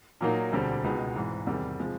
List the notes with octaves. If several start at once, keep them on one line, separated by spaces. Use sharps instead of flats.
A#2 F#3 A#3 D#4
E1 D2 D3 G3 C4
C#2 B2 G#3 B3 D#4
G#1 G#2 E3
E2 C3 D#3 G3
C3 F3 G#3